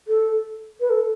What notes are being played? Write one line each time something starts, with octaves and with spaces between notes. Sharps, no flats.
A4
B4
A4